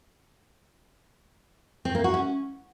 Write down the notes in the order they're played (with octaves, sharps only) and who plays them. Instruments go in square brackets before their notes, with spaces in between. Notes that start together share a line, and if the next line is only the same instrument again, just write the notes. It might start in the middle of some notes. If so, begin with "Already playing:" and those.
[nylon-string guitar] C4
A#3
F#4
C#4